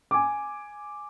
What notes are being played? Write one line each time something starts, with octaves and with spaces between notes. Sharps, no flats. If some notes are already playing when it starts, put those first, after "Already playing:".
G#5 D6